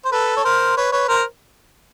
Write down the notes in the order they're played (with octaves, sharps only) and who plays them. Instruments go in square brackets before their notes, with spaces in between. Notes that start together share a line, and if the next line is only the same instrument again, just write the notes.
[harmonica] C5
A4 B4
C#5
A#4 C5
B4 C#5
B4 C#5
A#4 C5